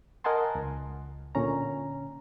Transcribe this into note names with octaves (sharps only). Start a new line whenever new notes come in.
A#4 D#5 F#5 G#5 A5 C6
C#2
A#2 D3 C#4 A#5